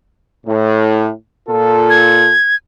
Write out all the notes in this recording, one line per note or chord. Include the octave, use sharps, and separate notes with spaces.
A2
A#2 F4 A4
G#6